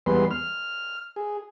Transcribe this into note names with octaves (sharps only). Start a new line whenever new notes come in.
E2 G3 G#3 B3 B4 C6
F6
G#4